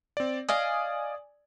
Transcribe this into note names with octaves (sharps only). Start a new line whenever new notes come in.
C4 D5
D5 D#5 F5 G#5 D#6